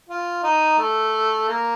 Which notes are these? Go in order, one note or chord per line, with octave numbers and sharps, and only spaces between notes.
F4
D#4
A3
A#3